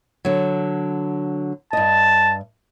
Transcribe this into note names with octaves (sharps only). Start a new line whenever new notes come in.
D3 F#3
G2 D#5 A5